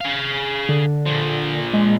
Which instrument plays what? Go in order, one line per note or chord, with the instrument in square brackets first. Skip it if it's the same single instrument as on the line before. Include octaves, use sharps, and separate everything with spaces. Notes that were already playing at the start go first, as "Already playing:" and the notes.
[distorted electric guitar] G#4 F5
[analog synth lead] D3
[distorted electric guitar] A#2 F3
[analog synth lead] G#3